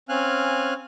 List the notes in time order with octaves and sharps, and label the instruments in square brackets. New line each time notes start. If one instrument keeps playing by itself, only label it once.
[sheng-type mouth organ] C4 C#4 F5 G#5 F6 F#6